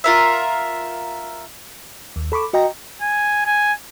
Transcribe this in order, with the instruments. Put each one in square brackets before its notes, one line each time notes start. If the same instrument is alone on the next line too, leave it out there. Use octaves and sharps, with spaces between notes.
[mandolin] F4 A#4 E5
[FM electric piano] D#2
A4 B5 C#6 D6
F#4 D#5 G5 A#5
[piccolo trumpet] G#5
G#5